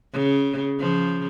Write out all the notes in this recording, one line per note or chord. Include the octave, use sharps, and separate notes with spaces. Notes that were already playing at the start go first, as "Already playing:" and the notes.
C#3
C#3 F3